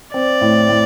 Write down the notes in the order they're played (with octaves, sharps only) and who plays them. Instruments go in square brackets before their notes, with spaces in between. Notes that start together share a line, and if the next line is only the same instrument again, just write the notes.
[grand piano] C4 [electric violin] D5
[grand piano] A2
A2